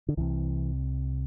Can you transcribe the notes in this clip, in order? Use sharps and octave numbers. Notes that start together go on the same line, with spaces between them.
D3
C2 C3 E3